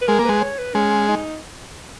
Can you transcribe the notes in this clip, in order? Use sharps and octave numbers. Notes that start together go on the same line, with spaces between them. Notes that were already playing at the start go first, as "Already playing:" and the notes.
B4
G#3 A#4
A#3
G#3 B4
C#5
B4
G#3 C#4
D#4